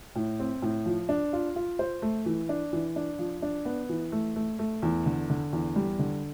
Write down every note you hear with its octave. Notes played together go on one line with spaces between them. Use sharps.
A2
C4
A2
F3
D4
F4
F4
C5
A3
E3
D4
E3
D4
F3
D4
B3
E3
A3
A3
A3
E2
D3
D3
E2
G3
D3